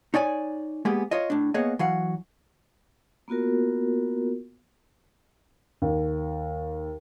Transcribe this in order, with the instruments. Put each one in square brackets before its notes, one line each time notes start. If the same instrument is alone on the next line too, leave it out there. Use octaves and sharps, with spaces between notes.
[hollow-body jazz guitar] D#4 C#5 D5 G#5
G#3 A#3 B3 G4 G#4
F4 C#5 D#5
A2 D4
A#3 B3 G#4 C#5 D#5
E3 F#3 F5 F#5
[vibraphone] A#3 B3 F4 F#4 A#4
[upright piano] D#2